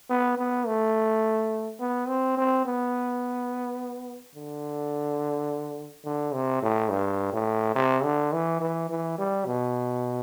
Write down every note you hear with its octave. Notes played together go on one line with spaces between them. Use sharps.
B3
B3
A3
B3
C4
C4
B3
D3
D3
C3
A2
G2
A2
C3
D3
E3
E3
E3
G3
B2